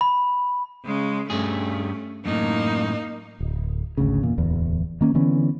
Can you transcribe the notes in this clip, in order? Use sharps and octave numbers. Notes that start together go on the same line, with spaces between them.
B5
C#3 G#3
G2 G3 A3 C#4 G#4
F#2 A2 A#3 D#4
D1
G#1 D2 C#3
E2 A#2
D1 E2
D#3 A#3 C#4
D3 E3 B3 C#4